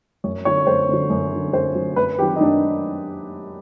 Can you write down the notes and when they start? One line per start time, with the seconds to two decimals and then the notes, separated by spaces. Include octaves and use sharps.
0.24 F#2 C#5
0.45 D3 F#3 C#5
0.67 F#2 C5
0.89 D3 F#3
1.10 F#2
1.32 D3 F#3
1.53 F#2 C5
1.75 D3 F#3
1.96 F#2 B4
2.18 D#3 F#3 G4
2.36 D#4
2.41 F#2 D4